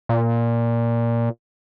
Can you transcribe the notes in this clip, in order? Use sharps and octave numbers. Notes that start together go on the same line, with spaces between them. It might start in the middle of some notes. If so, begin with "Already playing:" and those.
A#2